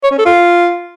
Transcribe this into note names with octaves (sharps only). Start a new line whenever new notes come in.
C#5
C#4
A4
F4